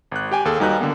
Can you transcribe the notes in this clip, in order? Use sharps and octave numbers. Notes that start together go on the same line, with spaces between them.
G#1 F#6
G4 G5 G#5
D#2 G#4 A4
D#2 G3 D#4 F#4 B4 F#6
D3 A#3 B3